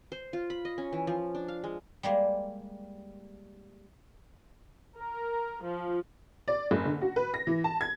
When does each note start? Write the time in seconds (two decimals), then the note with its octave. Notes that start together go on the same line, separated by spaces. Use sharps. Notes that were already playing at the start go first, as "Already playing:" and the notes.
0.12 C5
0.33 F4
0.50 B5
0.65 D#5
0.78 C#4
0.93 E3
1.07 F3
1.35 D4
1.48 F5
1.64 G#3
2.03 G3 G#3 A#3
4.97 A#4
5.64 F3
6.48 D5
6.71 F#1
6.85 D3
7.01 F#4
7.16 B4
7.34 A#6
7.47 E3
7.64 A5
7.81 G#6